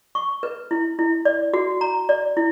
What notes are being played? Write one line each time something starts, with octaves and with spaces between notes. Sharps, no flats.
C#6
B4
E4
E4
D5
F#4
A#5
D5
E4